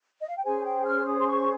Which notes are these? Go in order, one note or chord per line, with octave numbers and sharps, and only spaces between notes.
D#5
F5
G5
C#4 G#4 C5 G#5
G5
F6
D#6
C6
C#6